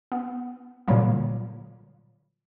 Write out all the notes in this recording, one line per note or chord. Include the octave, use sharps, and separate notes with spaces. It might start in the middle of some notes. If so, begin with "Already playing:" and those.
B3
A#2 D3 E3 F#3 G3 A#3